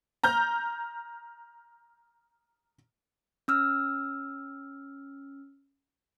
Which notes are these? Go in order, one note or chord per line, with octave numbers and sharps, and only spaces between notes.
A#5 F6 G6
C#4 E6 F6